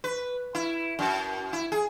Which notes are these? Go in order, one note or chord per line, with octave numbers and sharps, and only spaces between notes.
B4
E4
F#2
E4
G#4